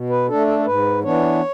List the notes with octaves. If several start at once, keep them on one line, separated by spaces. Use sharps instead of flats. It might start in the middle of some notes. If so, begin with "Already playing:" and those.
Already playing: B2
B4
A3 D4 A4
A4
A4
G#2 B4
E3 B3 D4 C#5